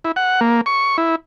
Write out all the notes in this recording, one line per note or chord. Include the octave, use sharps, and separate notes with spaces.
E4
F#5
A#3
C#6
E4